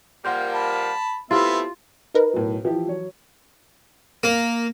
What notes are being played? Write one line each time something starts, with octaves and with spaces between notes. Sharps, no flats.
F3 G3 A#3 F#5 C6 G6
A5 B5
A3 B3 C4 E4 F4 G4 E5
D#4 A#4 B4
B1 A2
E3 F3 E4 G4
F#3 C#5
A#3